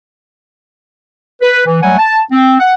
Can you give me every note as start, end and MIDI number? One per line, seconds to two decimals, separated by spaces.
1.41 1.62 71
1.65 1.80 52
1.82 1.96 54
1.82 1.96 55
1.82 1.96 57
1.82 1.96 78
1.82 1.96 80
1.98 2.19 81
2.30 2.55 60
2.60 2.74 78